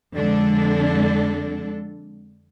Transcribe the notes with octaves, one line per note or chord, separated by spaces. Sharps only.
F2 D3 G#3 D4 A4